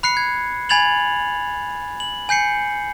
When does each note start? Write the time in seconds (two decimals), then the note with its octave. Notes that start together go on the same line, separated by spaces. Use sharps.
0.03 B5 F#6 C7 C#7
0.17 G#6
0.69 G#5 B5 G#6 A6 F7 F#7
2.00 F#7
2.29 G#5 G6 C7 C#7